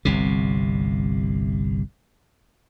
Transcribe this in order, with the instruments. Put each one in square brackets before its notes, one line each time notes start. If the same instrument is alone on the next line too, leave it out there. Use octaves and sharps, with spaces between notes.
[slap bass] G1 C2 C3